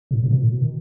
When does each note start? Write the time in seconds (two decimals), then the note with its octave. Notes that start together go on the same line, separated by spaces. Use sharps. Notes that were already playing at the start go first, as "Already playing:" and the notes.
0.11 A2
0.23 A2
0.31 B2
0.41 A2
0.51 B2
0.61 D#3